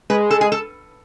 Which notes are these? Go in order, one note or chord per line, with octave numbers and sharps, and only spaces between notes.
G#3 B4
A4
G#4
A4